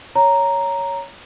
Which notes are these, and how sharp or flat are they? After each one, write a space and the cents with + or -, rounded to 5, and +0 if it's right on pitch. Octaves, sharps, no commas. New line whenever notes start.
C#5 +5 A#5 +0